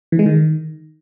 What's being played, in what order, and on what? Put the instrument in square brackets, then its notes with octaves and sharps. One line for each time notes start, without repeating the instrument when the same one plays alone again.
[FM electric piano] E3
G#3
D#3